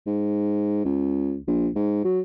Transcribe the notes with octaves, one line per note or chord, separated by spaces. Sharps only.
G#2
C#2
A#1
G#2
F#3